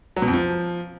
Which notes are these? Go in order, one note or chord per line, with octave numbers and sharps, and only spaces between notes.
F#3
B2
F2
F3